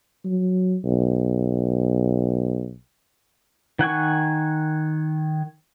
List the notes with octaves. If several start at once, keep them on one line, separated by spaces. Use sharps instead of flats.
F#3
B1
D#3 F#5 G#5 C#6